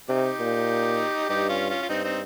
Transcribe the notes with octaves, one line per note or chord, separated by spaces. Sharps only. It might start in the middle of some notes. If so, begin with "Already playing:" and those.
C3 D#4 G4
A#2
G2 D#4 G4
C#4 F4
C#4 F4
F4
G2 C4 D#4
C4 D#4